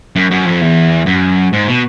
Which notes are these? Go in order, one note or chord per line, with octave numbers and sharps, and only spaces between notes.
F#2
F#2
F2
E2
F#2
G#2
B2